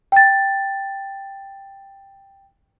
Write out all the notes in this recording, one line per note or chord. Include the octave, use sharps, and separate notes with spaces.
G5 A6